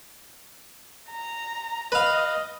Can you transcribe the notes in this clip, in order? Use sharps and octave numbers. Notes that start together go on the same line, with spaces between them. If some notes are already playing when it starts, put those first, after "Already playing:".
A#5
B4 D#5 F5